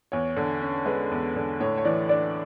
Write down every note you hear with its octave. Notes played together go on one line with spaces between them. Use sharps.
E2 C#5
D3
C#4
G#3 B4
E2
D3
A2 C#5
C#5
E3 D5
D4 D5